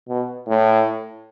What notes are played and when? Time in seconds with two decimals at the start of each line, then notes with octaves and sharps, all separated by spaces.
0.08 B2
0.47 A2